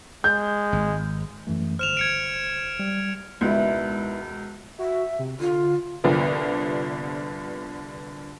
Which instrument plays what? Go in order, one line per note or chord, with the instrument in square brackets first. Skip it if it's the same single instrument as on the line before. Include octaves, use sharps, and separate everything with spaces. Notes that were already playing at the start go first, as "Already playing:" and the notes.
[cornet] G#3 [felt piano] G6
[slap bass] G#1
[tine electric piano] F#2 E3 A3
[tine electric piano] G1 C5 [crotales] F6 E7 F7
[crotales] G#6 C#7 D7
[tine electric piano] G3
[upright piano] E1 C#2 [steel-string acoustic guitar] D#4 E4 B4
[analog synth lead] F#4 [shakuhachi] E5
[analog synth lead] C3
[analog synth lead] D3 [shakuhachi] F4
[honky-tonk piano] C2 G2 D3 F3 B3